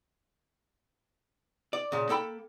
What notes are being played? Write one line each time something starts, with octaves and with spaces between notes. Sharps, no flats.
D5
A#2 C#3
A#3 A4 G5 B5